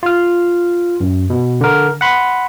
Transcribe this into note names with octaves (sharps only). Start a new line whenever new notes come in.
F4 F6
F#2
B2
D3 A#4
F#5 B5 C6